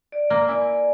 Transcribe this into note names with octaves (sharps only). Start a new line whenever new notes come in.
D5
A#3
E4 D5 G#5